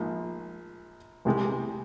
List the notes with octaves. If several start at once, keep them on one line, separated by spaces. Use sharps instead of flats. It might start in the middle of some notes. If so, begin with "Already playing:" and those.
Already playing: A#1 G#2 F3
C2 C3 E3 G#3